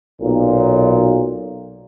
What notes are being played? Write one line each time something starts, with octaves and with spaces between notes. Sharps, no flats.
B1 A#2